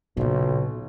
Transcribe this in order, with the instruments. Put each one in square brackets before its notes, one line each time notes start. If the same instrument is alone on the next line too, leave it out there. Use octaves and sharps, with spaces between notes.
[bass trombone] B1 [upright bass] A#2 C#3